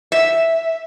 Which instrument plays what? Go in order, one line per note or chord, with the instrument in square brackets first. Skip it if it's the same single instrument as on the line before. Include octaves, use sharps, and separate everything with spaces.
[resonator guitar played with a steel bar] E5